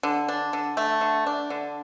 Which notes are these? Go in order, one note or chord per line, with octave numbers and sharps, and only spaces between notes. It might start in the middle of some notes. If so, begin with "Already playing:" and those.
D3
D4
D3
A3
D3
D4
D3